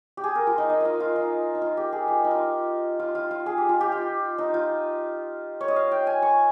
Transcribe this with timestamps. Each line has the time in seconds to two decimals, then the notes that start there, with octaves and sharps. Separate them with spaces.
0.17 G4
0.24 G#4
0.35 A#4
0.47 F4
0.58 D#4
0.70 D#4
0.80 D#4 F4
1.00 F4
1.16 D#4
1.55 D#4
1.62 F4
1.77 G4
1.92 G#4
2.08 G4
2.24 D#4
2.31 F4
2.99 F4
3.15 F4
3.31 F4
3.46 G#4
3.58 G4
3.69 F4
3.81 G4
3.92 F4
4.38 D#4
4.54 F4
5.61 C#5
5.68 D#5
5.76 F5
5.91 G5
6.07 G#5
6.22 C#6